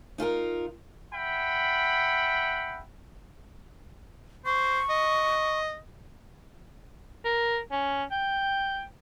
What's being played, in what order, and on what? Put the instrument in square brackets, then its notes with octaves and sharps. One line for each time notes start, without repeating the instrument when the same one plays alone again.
[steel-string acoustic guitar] D#4 F4 A4 A#4
[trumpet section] E5 F#5 G5 B5
[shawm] C5 [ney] C#6
[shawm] D#5
[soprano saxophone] A#4
C#4
G5